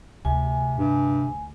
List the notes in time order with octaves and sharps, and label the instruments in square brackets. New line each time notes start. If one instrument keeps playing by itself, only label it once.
[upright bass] D2 [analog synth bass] C3 [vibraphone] G#5
[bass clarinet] G2 [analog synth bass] C3